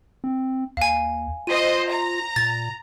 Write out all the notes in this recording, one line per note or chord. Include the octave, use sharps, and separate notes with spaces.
C4
D#2 F5 G#5
F4 C5 D#5 D#7
A#5
A#2 A6